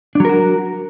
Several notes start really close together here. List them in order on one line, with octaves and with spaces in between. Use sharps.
D4 F#3 A#4 F#4